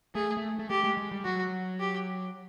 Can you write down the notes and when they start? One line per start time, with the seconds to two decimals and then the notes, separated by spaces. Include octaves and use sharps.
0.15 A3 G#4
0.37 A3
0.59 A3
0.70 A3 G4
0.84 G#3
0.97 G#3
1.11 G3
1.25 F#3 F#4
1.80 G4